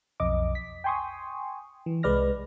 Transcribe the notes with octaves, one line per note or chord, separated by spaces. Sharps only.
B1 F2 D#5 D6
B6
G5 G#5 C6 C#6 D#6
E3
C2 G#3 B4 D5 F6 A#6